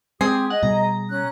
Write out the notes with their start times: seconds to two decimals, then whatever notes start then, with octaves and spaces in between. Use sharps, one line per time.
0.21 G#3 C4 G4 G#4 D#6
0.50 D#5 F#5
0.63 B2 G3 A#5
1.08 C#4 F#6